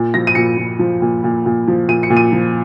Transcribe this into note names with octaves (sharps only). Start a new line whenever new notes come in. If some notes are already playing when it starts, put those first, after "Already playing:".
Already playing: A#2
F3 A#6
D#7
A#2 C#7
A#2
F3
A#2
A#2
A#2
F3
A#2 D#7
C#7
A#2
D#7
F3